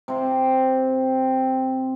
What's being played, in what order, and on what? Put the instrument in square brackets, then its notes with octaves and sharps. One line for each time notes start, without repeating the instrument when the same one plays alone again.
[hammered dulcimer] C3 C4